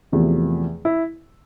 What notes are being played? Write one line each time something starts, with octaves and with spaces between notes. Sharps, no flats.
E2 C3 F3 A3
E4